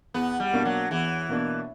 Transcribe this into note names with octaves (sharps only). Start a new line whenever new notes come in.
E2 B3
G3
B2 A#3 D4
F#3
E2 E3
B2 A#3 D4